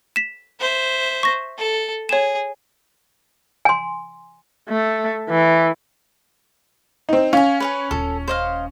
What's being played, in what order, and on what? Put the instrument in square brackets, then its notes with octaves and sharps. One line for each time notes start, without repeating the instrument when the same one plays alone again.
[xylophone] B6 E7
[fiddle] C5 E5
[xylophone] C#6 A#6
[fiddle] A4
[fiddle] G#4 [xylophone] C#5 E7
[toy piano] G#5 C6
[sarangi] A3
E3
[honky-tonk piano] C4 D#4
[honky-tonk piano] C#4 [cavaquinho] F5 G#5
[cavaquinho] B4 C#5 G#5
[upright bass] D#1 F4 [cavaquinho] A4
[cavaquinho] C5 D#5 F5